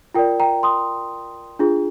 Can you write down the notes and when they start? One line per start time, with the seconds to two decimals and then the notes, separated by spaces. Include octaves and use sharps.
0.14 F4 A#4 D5 G5
0.40 G5 A#5
0.63 C6 D#6
1.59 D4 F4 G#4